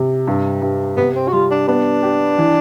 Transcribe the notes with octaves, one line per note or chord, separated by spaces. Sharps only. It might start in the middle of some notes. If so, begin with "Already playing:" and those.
Already playing: C3
G2
G2
C3 B3
C4
F#4
G3 F4
D4
B3 D4
G4
E3